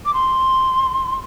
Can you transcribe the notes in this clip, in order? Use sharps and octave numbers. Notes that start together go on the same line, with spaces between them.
D6
C6